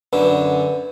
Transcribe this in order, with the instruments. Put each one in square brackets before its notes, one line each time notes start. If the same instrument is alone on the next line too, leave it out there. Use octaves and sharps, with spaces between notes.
[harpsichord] F#2 D3 [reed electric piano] B4